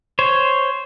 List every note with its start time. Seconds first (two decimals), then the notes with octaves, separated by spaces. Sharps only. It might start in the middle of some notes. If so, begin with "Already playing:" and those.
0.19 C5 C#5